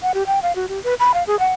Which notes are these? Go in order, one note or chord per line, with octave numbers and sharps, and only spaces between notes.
F#5
G4
G5
F5
F#4
G4
B4
B5
F5
G#4
F#5